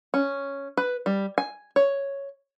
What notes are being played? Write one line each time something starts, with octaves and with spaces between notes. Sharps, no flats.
C#4
B4
G3
G#5
C#5